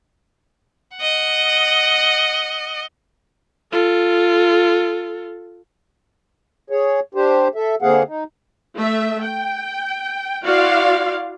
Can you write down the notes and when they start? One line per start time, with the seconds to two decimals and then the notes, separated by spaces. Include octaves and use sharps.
0.97 D#5 F#5
3.72 F4 A4
6.70 G#4 C#5
7.15 D4 G4 C5
7.55 A4 E5
7.82 D3 A#3 C4 G#4 F5 F#5
8.07 D#4
8.77 A3 E5
9.23 G5
10.43 E4 F#4 D5 F5 C6